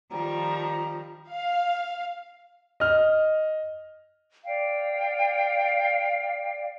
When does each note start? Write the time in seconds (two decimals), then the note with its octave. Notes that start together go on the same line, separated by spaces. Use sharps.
0.11 D#3 F3 G3 A#5
1.30 F5
2.80 D#5 F6
4.45 D5 F5 G5